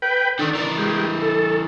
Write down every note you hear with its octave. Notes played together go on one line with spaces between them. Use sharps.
B4 G5
D3 D#3 D4
E3 A#4
G#3 G4
A4